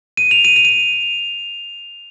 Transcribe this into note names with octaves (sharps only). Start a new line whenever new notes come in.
D#7
F7
D#7
F7
D#7